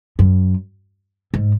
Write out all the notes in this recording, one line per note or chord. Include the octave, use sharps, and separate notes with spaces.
F#2
G#2